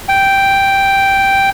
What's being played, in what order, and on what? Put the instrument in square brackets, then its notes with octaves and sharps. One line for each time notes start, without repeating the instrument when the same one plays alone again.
[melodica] G5